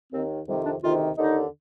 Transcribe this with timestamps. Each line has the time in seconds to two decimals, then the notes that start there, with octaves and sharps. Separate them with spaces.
0.12 D#2 D#3 C4
0.47 F2 C3 D#3 G3
0.65 D4
0.82 D2 C3 D#3 F4
1.17 D#2 D3 D#4